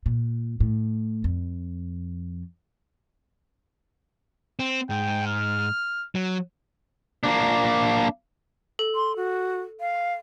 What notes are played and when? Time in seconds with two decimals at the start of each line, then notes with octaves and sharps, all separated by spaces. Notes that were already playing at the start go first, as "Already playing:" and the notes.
0.06 A#2
0.60 A2
1.24 F2
4.59 C4
4.90 G#2 G5
5.27 F6
6.15 F#3
7.23 A#3 D4
8.79 A4
8.95 C6
9.16 F#4
9.80 F5